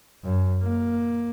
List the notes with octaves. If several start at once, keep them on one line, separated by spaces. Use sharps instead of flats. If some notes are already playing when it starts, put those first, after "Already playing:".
F#2
A#3